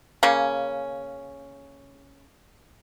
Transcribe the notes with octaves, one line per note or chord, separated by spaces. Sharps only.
C#3 A#3 C#4